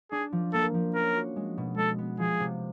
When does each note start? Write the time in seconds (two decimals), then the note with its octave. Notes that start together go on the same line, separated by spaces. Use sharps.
0.12 D4 G#4
0.32 F3
0.53 A#3 A4
0.74 F3
0.95 C#4 A#4
1.15 F#4
1.36 G#3
1.58 B2
1.78 G#3 A4
1.98 B3
2.19 F3 G#4
2.40 C3